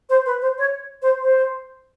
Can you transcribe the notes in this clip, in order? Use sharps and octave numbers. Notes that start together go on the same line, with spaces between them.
C5
B4
C5
C#5
C5
C5